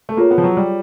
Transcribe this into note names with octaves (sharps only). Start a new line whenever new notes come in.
A3
A#3 F4 G#4 C#5
B3
F3
F#3
G3